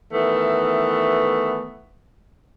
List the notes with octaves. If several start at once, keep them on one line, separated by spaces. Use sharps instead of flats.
D#3 E3 A3 B3